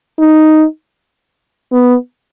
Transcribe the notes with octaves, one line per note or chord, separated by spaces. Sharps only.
D#4
B3